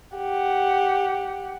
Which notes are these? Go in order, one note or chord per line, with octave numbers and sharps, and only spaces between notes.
G4 F#5